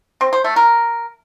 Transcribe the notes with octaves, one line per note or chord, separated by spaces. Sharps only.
C4
C5
A3
A#4